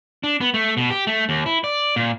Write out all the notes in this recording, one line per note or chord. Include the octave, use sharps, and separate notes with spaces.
D4
B3
A3
B2
G4
A3
D#2
E4
D5
A#2